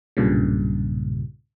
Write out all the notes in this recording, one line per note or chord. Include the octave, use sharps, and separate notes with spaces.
B1 G2 A#2 C#3